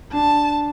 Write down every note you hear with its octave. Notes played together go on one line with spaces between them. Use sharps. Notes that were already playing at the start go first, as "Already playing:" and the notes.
D4 A5